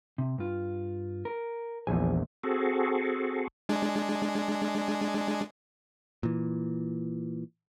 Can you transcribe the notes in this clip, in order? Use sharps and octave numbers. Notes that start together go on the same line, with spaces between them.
C3
G2 F4
A#4
A#1 E2 F3 G#5
C4 F#4 G#4 A4
G#3 D4 G#4
A#2 E3